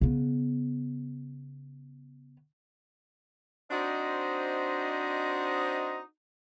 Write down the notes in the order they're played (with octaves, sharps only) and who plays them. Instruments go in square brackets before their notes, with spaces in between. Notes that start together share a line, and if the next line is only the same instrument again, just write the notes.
[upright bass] C#3 B3
[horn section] C4 D4 D#4 F#4 C5 D#5